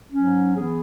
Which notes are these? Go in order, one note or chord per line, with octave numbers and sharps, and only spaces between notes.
G#2 F#3 C#4
E3 B3 G#4